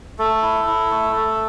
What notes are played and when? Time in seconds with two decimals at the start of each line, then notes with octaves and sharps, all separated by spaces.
0.19 A3 A4
0.42 E4
0.67 E4
0.91 A3
1.16 A3